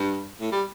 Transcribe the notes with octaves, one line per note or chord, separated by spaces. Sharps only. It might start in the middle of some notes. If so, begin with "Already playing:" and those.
Already playing: G2
A2
G3